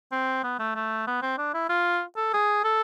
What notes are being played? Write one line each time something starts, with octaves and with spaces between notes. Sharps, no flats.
C4
B3
A3
A3
B3
C4
D4
E4
F4
A4
G#4
A4